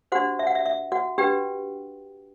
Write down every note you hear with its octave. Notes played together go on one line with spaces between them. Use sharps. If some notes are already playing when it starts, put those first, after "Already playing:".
D4 F#4 G4 C5 F#5
E5
F#5
E5
E5
F#4 F#5
D4 F#4 G4 B4 G5